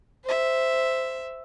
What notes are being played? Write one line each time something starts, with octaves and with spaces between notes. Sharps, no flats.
C5 E5